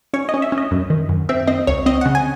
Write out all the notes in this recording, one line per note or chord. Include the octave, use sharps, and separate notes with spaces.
C#4 C#5
D#5
C#4
E5
C#4
D#5
F#2
D#3
F#2
C4 E5
C4 D#5
C#2 C#5
C4 D#5
C#3 F#5
G#5